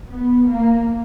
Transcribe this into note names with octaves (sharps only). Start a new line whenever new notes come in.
B3
A#3